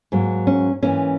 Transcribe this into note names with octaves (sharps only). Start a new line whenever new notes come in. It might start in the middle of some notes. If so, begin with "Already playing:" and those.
G#2 F#3 A#3
C#4
G#2 E3 A#3 C#4